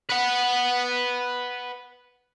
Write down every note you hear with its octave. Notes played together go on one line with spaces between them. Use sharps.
B4 F#5